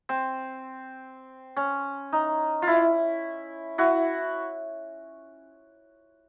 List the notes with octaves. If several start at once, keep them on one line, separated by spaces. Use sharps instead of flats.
C4
C#4
D#4
F4
E4
E4 F#4